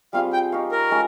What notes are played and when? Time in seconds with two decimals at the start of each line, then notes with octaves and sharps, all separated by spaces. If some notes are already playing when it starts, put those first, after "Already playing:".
0.13 G3 C4 F4 G#4 F5
0.33 G5
0.52 D#4 G4 C#5 F5
0.72 A#4
0.91 G#3 C#4 F4